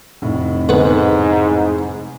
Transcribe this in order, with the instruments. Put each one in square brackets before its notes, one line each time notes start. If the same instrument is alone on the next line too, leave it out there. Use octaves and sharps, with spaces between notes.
[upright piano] F1 A2
[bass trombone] G#2 [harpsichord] D3 B3 B4